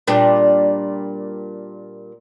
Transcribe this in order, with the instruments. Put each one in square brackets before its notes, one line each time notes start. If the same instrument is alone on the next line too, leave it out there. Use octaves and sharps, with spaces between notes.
[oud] A#2 G3 D4